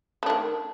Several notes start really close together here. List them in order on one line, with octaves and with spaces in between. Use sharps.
A3 D4 D#3